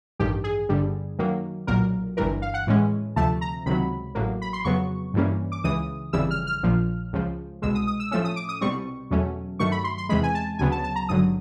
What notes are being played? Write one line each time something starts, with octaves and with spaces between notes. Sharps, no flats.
A1 G2 D#3 G4
G#4
G1 G2 D3 G3
F#2 D#3 F#3 A#3
B1 A#2 F#3 A#4
G1 G2 E3 A#4
F5
F#5
A2 E3 G#3 C#4
D2 C3 F3 A3 A5
A#5
C#2 C3 D#3 F#3 B5
A1 A2 F#3 A#3
B5
C6
F2 C#3 F#3 B3 C#6
G2 E3 G3 A#3 C#4
D6
C#2 C#3 E3 D#6
G1 F2 C#3 E3 G3 E6
F6
F6
A#1 A#2 F3
C#2 C#3 F3
C2 B2 G#3 E6
D#6
D#6
E6
A2 F3 A3 C#4 E6
D#6
D6
D#6
C2 B2 G3 C4 C#6
E2 B2 F#3 A3 C#4
G2 D#3 F#3 A3 C#6
B5
C6
C6
E2 C3 E3 G#3 B5
G#5
A5
D2 C#3 F#3 B3 G#5
A5
A5
A#5
G#1 G2 D3 F#3 D#6